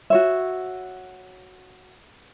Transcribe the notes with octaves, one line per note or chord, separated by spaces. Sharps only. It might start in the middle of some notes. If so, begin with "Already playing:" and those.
F#4 C#5 E5